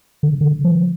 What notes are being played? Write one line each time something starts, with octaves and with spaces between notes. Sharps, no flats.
D3
D3
F3